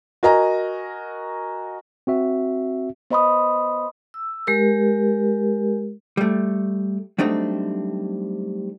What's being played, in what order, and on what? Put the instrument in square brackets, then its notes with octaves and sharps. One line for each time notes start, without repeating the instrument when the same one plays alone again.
[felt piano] F#4 A#4 D#5 G#5 A#5
[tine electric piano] C4 F#4 E5
[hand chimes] B3 C5 D#5 B5 C6 D#6
[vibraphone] E6
G#3 G4 A#4
[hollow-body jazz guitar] G3 A3
F#3 G3 A3 C4 D4 D#4